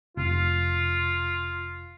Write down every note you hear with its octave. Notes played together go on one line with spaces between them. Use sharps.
F1 F4